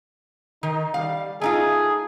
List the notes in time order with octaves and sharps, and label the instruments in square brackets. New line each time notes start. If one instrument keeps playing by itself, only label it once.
[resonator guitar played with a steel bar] D#3 [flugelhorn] D#4
[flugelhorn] G3 [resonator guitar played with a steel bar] F5
[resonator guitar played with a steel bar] A3 D#4 F4 [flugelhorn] G#4